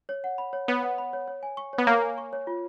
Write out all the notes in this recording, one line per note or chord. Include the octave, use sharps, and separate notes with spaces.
C#5
F#5
B5
C#5
B3 C#5
F#5
B5
C#5
C#5
G#5
C#6
C#5
B3
A#3 C#5
G#5
C#6
C#5
F4